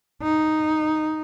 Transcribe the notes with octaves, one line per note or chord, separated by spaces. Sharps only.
D#4